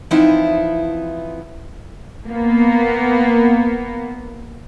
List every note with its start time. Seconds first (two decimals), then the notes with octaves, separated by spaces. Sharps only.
0.11 E3 F3 B3 C4 D#4 E4
2.28 A#3 B3